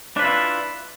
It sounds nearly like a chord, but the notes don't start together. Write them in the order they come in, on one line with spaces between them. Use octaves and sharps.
D4 B4 F4 E4